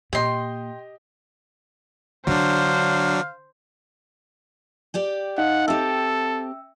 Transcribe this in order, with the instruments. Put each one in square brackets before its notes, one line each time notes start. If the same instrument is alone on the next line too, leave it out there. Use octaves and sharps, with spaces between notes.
[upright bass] A#2 [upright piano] G4 D#5 [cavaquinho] G5 C6
[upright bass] D3 [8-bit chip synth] F#3 D4 [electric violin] C5 [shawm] F5
[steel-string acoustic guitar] G4 D5 G5
[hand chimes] D#4 D#5 F5 [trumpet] F#5
[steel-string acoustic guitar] C4 G4 [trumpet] A4 [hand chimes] E5 G5 E6